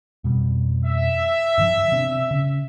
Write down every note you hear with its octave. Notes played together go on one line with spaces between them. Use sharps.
F2 B2 G3
E5
G2 D#3 F3
C3 C4 D4
C#3